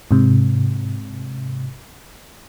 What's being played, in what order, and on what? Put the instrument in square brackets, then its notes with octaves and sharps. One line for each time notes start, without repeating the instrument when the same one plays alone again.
[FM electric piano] G#2 C3